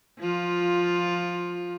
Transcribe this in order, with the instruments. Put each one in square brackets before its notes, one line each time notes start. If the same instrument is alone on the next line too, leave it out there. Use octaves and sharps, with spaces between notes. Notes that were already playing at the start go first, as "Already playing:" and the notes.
[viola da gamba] F3 F4